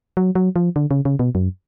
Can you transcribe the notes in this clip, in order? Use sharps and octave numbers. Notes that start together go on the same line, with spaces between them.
F#3
F#3
F3
D3
C#3
C#3
B2
F#2